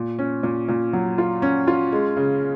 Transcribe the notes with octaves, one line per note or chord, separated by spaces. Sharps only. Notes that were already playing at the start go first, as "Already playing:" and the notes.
Already playing: A#2
C#4
A#2
A#2
F#3
F4
C#4
F4
G#3
C#3